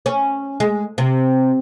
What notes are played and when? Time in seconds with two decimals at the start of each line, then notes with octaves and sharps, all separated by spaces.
0.06 C#4
0.60 G#3
0.98 C3